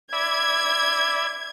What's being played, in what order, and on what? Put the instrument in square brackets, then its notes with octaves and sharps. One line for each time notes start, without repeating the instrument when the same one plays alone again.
[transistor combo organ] D5 E5 B5 [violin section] G#6